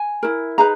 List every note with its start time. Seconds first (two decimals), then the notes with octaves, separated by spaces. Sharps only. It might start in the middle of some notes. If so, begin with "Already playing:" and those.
Already playing: G#5
0.23 E4 A#4
0.58 D#4 G#4 B4 A#5